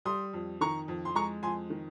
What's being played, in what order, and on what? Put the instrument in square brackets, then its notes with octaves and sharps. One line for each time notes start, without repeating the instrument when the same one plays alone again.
[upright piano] G3 C6 D#6
F2
D#3 A#5 C#6
F2
C6
G#3 A#5 C#6
F2 G#5 C6
D#3